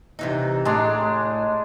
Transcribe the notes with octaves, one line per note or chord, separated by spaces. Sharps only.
C3 E3 D#4
A2 G#3 D4 A#5